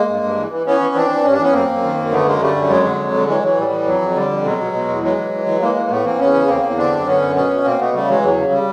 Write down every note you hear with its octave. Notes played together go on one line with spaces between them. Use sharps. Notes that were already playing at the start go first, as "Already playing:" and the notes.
Already playing: G#3 A#3
G2
G2
E3
E3
E3 B3 C#4
E3
E3 C4 D4
E3
G2 C#4
D4
E3 B3 C#4
F#2 A#3 C4
F#2
D#3
F#2
D3 A3 B3
F#2 G#3 A#3
D3 G3 A3
F#2
F2 F#3 G#3
D3
F2
D3
E3 F#3 G#3
E3 F#3
A2 G3
E3
F2 F#3
F2
D3 G3
F2
B2 F#3 G#3
B2
B2
E2
E3 F#3 G#3
E3
E3
E3
E3 G#3 A#3
E3
A2 A3 B3
E3 A#3 C4
E2 B3 C#4
C#3
E2 A#3 C4
E2
D3 C4 D4
F#2
D3 B3 C#4
F#2
B2 B3 C#4
B2
B2 A#3 C4
B2 A3 B3
C#3 G3 A3
E3 F#3 G#3
E2 F#3
C#3
G3